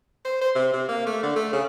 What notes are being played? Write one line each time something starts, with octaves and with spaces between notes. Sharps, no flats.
C5
C5
C3
C3
A#3
A3
D3
A3
C#3